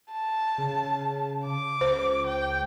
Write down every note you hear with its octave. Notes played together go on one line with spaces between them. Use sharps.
A5
C#3
D6
C#2 C5
G5